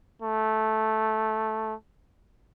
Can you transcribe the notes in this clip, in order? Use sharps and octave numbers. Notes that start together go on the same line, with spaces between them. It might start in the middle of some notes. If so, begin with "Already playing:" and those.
A3